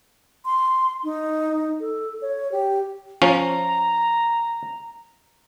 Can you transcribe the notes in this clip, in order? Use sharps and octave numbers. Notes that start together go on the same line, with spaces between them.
C6
D#4
A4
C#5
G4
F3 C#4 A#5